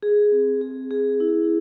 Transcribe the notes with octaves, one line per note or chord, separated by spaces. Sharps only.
G#4
C4
G#4
G#4
E4